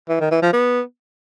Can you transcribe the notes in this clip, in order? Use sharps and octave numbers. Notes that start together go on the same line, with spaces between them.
E3
D#3
E3
F3
B3